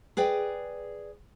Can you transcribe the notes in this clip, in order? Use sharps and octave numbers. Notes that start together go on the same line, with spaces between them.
G#4 B4 D5 G5